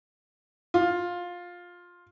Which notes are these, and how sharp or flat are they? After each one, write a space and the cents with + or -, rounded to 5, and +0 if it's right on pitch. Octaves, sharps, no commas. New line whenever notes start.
F4 +15